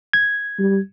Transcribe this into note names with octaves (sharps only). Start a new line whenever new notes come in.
G#6
G3